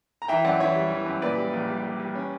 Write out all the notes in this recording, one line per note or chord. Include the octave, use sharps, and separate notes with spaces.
A#5
E3 E5 G5
F#2 D5 F#5
E3 C#5 E5
G3
E3
F#2
A#2 B4 D5
G3
A#1
G3
G3
G3
C#4